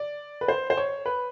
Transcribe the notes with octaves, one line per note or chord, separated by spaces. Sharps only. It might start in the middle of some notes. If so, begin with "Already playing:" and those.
Already playing: D5
B4
C5
C5
C#5
B4